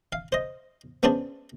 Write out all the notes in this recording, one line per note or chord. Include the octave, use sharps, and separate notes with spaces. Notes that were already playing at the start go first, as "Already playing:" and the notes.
F5
C5 D#5
B3 C#4 D4 G#4 C5 A5